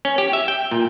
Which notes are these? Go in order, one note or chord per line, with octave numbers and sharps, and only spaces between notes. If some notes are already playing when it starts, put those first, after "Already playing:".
C#4
G4
E5
G5
A#2